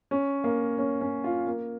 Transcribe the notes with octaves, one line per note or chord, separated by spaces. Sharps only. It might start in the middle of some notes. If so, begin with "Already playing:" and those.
C#4
A#3
C#4
C#4
F4
A#3